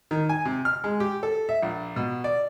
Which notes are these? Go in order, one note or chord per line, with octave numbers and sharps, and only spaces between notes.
D#3
G#5
C3
F6
G#3
G4
A4
E5
A#1
B2
D5